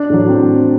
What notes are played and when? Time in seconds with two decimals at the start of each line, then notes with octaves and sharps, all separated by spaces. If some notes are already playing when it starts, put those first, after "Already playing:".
Already playing: D4
0.10 A2 F#3
0.29 C4